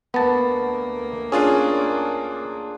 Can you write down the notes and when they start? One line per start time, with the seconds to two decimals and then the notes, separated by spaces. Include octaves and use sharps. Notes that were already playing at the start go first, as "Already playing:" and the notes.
0.14 D2 A#3 B3 A5
1.32 C#4 D4 F4 G#4